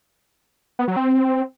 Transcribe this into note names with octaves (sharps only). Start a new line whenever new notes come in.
B3
F#3
C4